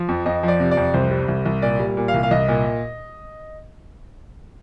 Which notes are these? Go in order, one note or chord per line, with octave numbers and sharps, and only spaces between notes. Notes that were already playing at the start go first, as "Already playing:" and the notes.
Already playing: F3
F2
F2 D#5
F3
D5
C3
D5
F2
C2 C5
G3
C2
C2
A#2 D5
G3
A#2
F5
C2
F5
C2 D#5
A#2